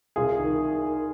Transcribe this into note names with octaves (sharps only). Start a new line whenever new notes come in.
C2 F4 G#4
D#3